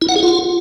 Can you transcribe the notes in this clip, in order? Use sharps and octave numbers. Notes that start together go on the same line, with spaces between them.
E4
F#5
G#4
F4